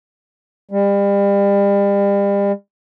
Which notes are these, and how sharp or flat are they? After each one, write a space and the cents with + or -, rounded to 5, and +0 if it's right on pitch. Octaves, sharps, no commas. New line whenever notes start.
G3 +35